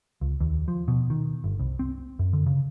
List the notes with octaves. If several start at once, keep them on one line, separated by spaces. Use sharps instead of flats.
C#2
D#2
F3
B2
D#3
G1
C2
C4
F#2
D3
C#3